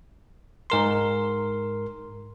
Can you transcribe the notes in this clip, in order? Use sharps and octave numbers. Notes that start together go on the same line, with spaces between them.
G#2 A#4 C6